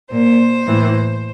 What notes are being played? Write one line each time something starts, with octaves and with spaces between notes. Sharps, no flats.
A#2 C5
A2 E3